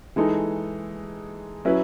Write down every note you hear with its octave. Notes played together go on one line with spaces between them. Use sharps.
E3 G#3 D#4 A4
F#3 C#4 E4 B4